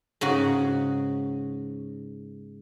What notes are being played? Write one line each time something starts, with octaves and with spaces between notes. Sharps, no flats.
G#2 C#3 F#4